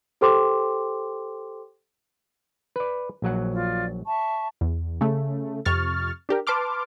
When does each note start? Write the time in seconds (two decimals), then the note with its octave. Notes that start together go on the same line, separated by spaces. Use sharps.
0.21 G4 A4 C5 G5 C6 D6
2.76 B4 D5
3.22 A#1 F#3 F#5
3.52 F4 D5
4.06 E5 A5 C#6
4.61 E2
5.01 C#3 A3
5.65 F2 C3 C#6 F6 A6
6.29 D4 G4 A#4
6.47 B4 A5 C6 D6 F6